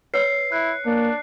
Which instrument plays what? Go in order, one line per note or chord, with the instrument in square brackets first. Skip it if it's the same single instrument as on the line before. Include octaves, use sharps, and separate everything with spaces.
[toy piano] B4 C#5 E6 [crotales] C7 C#7
[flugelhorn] E4 [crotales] F#6
[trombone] A#3 [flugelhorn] D4